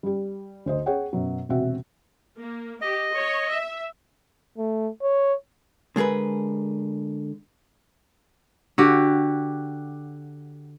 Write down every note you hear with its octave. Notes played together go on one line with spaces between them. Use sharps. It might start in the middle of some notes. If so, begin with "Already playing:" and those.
G3 G4
D2 C5 D#5
G#4 C#5 F#5 G5
F#2 B2 F#3
E1 C3 C4 F#4 E5
A#3
G4 D#5
C#5
E5
A3
C#5
D3 G#3 G#4 A#4 B4
D3 F#4 G4